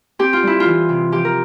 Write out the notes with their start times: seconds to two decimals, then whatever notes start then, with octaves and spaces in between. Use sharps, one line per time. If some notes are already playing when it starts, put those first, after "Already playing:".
0.19 C4 G4
0.33 F4
0.43 G3 E4
0.60 F4
0.65 E3
0.89 C3
1.12 F3 G4
1.25 A#4